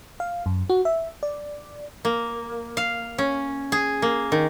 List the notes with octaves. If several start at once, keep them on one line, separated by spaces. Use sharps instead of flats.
F5
F#2
F#4
E5
D5
A#3
F5
C#4
G#4
A#3
D#3